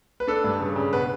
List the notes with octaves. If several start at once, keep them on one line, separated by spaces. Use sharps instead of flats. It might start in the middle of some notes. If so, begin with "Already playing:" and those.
B4
D4 A4
G2
C#3
C#3
B2 B4